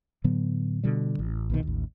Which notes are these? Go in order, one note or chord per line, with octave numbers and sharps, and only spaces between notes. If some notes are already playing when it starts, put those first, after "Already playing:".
A2 D3 F#3 B3
B2 D3 G3
A1
A#1 B2 D#3
A1 D#2